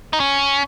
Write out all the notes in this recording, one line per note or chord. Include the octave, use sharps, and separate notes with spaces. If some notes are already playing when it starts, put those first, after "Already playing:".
D#4
C#4